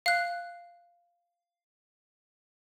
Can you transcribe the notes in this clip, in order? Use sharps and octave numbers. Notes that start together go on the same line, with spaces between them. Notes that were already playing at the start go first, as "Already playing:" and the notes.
F5 F#6